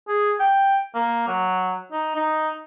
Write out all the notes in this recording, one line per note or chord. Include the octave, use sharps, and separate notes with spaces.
G#4
G5
A#3
F#3
D#4
D#4